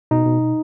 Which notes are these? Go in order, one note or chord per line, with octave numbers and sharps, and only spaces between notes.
B2 D#4
B2
B2